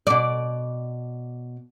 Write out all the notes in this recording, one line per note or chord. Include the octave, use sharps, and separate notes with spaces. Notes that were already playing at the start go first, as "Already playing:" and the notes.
B2 D5